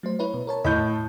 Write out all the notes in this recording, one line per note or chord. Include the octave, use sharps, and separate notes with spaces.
F#3 A3 C5
E4 B4 C#5
B2
A#4 C#5 A5
A2 D#5 A5 G6